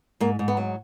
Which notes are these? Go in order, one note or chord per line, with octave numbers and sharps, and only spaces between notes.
G#2 A#3
G#2
B3
F#3